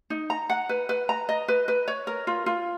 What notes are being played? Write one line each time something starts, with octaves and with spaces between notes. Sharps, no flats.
D#4
A#5
F#5
B4
B4
A#5
D#5
B4
B4
C#5
A#4
F4
F4